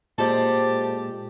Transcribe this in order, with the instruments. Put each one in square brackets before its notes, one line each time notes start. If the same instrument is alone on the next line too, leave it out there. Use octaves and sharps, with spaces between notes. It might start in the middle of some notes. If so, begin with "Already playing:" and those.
[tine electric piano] A#2 G#3 [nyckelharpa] G4 [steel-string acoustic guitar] A4 C5 D5 [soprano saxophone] A5